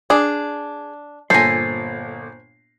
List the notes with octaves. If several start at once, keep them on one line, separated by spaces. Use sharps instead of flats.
D4 G#4
G1 A#2 A4 C5 G#5 A#6 C7